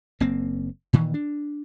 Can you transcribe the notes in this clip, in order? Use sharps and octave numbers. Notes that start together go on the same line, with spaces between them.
F#1 A#3 C4
A#2 D#3 E3
D4